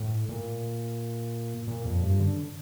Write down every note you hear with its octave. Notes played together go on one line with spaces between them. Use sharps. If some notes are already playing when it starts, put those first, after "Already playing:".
Already playing: A2
A#2
A#2
F2
G2
D3